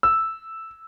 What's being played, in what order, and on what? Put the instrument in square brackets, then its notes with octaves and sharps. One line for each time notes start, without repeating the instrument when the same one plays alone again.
[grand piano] E6